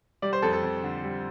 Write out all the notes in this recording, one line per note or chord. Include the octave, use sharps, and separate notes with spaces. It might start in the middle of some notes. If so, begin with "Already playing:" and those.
G3 D5
C5
F2 A4
A4
F2
D3
G3